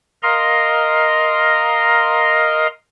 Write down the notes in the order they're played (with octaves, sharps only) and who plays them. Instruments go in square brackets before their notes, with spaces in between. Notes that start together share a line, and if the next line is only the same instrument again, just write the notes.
[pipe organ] A#4 D#5 F5 A#5 C6